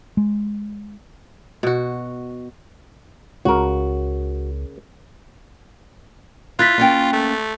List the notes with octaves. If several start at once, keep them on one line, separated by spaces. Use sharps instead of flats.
G#3
B2 F#4
C#2 C#3 F#4 A#4
E4 F4 F#6 A6 B6
A#3 C#4 G5
A3